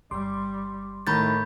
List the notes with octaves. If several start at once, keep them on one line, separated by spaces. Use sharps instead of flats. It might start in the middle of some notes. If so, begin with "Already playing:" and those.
G1 G3 C6 D6
A2 D#3 A3 A#5 B5 G6 A6